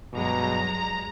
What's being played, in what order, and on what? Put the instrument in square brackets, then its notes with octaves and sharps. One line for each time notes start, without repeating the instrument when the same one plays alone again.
[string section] G2 F#3 G#3 [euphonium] B2 [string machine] A#5